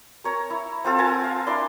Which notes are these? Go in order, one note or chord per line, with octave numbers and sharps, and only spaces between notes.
A#4 C#5 A#5
E4
C4 F4 A4
A#4 F#5 G#5 A5
F5
D4 E4 D5 C6